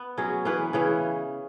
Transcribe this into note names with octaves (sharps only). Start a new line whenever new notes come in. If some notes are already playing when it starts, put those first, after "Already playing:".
Already playing: B3
F#3 C#4 G#4
E3 C#4 G#4 B4
C#3 E3 C#4 G#4